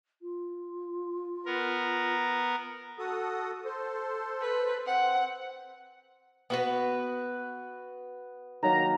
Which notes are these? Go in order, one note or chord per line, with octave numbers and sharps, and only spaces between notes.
F4
B3 A#4
F#4 A4 D#6
A4 C5
B4
C4 F#5
B3 F#4 B4
D#3 F#3 A#3 A#5